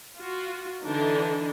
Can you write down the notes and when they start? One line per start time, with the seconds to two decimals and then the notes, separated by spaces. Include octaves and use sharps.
0.17 F4 F#4
0.83 D3 E3 D4 D#4